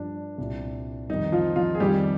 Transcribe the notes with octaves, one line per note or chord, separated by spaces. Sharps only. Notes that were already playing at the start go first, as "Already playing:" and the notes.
Already playing: G2 F3 D4
C2 A#2 G3
F2 D#3 G3 D#4
F3 F4
F3 F4
G#4
F2 D#3 G3 G4